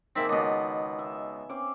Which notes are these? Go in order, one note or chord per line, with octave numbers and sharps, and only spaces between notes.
D#3 A#3 C4 E4 G#4
C#2 B2 B3
E5
C4 C#4 D6